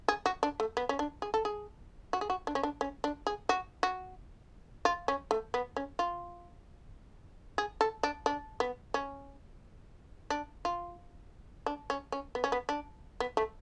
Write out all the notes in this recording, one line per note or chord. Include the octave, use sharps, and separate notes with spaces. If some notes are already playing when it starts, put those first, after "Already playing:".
G#4
F#4
D4
A3
B3
C#4
D4
G#4
A4
G#4
F#4
G#4
F#4
D4
C#4
D4
C#4
D4
G#4
F#4
F#4
F4
C#4
A3
B3
C#4
F4
G#4
A4
D4
D4
B3
C#4
D4
F4
D4
C#4
C#4
B3
C#4
B3
D4
B3
A3